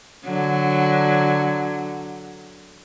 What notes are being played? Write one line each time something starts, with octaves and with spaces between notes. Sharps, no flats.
D3 F#3